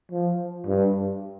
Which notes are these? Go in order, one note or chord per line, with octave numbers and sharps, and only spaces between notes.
F3
G2